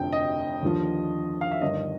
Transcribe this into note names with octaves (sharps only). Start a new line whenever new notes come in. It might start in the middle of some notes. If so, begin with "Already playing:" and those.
Already playing: F1 F2 D3 G5
D#5
D#2 D3 F3
F5
E5
G1 G2 D#3 D#5